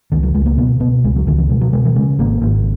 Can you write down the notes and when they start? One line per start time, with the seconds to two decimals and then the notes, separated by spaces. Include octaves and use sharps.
0.12 C#2 D#3
0.23 F#3
0.35 C#2 G#3
0.46 A#3
0.57 B2 B3
0.80 B2 B3
1.04 C#2 G#3
1.16 F#3
1.27 C#2 D#3
1.38 E3
1.49 B2 G#3
1.61 F#3
1.73 B2 G#3
1.85 E3
1.95 C#3 G#3
2.19 G#1 A#3
2.41 G#1